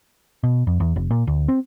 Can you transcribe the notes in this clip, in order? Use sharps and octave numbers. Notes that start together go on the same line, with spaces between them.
B2
F2
E2
F1
A#2
D2
C4